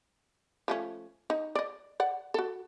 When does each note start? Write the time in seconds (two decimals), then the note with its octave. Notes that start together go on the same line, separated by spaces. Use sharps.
0.68 F3 A3 C#4
1.30 D#4
1.55 D5 D#5
2.00 D5 F#5
2.34 F#4 A4